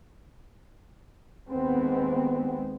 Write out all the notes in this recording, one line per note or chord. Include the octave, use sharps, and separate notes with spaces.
D#2 G#3 B3 C4